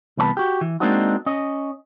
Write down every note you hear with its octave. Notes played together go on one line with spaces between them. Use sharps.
C2 E3 B3 C#5 A5 B5
F#4 G4
E3
G#3 A#3 C4 D4 D#4 F#4
C#4 D#5